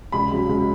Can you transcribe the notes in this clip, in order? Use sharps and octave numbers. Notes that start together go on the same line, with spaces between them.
C#2 B5
C#3 F#3
C#2